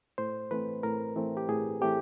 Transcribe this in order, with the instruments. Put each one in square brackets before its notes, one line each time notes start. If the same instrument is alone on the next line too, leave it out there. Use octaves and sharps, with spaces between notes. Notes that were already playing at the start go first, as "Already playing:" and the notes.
[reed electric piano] A2 C5
E3 A3 C4 B4
A2 A#4
E3 A3 C4
G4
A2 G#4
E3 A3 C4 G4